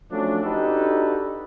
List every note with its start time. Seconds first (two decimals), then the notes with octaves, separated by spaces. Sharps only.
0.11 F3 F#3 A3 C#4 D4
0.43 D4 D#4 F#4 G4 A4 B4